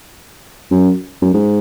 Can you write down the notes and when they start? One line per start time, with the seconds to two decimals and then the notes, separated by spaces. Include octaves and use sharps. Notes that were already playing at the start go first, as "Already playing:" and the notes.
0.71 F#2
1.22 F#2
1.34 G#2